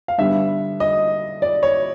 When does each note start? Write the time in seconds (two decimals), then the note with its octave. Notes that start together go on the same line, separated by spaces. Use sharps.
0.08 F5
0.18 G2 D3 G3 B3 E5
0.80 D#5
1.42 D5
1.63 C#5